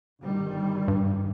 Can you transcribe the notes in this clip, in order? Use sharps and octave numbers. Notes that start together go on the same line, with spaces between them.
G1 D#3 G3
G2